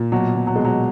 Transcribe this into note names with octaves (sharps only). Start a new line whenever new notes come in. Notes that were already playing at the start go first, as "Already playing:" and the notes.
Already playing: A#2
B2 F#3
B2
F#3
B2 G#3
F#3